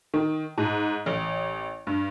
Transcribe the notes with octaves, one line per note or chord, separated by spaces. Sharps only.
D#3
G#2
A1
G2